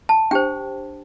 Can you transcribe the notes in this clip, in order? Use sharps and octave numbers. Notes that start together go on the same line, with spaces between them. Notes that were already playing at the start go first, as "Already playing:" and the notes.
A5
D4 G4 C5 G5